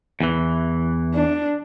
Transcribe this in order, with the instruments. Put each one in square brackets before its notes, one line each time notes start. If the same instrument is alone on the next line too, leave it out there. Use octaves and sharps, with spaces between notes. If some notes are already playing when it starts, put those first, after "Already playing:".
[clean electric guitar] E2 E3
[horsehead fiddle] D4